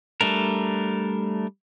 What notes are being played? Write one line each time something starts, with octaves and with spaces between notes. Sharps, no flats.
G3 A3 D4 A#4